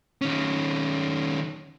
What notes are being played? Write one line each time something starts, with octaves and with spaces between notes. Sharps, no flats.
D#3 C#4